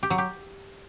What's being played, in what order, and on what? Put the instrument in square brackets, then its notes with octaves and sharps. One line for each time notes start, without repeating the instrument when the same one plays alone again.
[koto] G4
F#3
G4